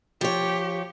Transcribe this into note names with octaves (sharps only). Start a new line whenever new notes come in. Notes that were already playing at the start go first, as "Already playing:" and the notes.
F3 G4 C#5